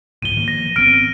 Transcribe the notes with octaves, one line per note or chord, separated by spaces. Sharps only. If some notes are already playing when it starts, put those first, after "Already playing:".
C2 G#2 F3 D#7 G7
D#3 F3 A#3
A#6
G#1 B3 C4 F6 D7 D#7